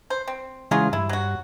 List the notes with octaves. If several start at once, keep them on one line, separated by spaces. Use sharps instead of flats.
C5
C4
C#3 E3 F#3 G#3 F4 G#4
G2 E4
F#3 F#4